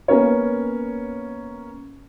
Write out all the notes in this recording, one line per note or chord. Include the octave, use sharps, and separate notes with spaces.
A#3 B3 C#4 A#4 C#5